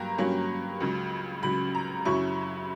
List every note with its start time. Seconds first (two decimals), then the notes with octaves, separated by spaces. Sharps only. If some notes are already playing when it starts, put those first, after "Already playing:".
Already playing: G2 F#3 A#3 G5 A#5
0.18 G2 F#3 A#3 C#4 B5
0.80 C#2 C#3 F#3
1.43 C#2 C#3 F#3 B5
1.75 A#5
2.05 F#2 C#3 F#3 C#4 E4 C#6